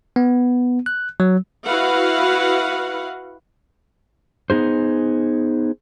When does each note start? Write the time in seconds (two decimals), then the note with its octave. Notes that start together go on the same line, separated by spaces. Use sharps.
0.16 B3
0.86 F#6
1.20 F#3
1.66 E4 F#4 B4 F5 F#5
4.50 B3 D#4 G#4 C5